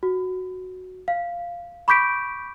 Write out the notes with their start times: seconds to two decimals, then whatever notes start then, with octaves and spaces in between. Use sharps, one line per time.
0.03 F#4
1.08 F5
1.88 B5 C#6 D6 G6 B6 D7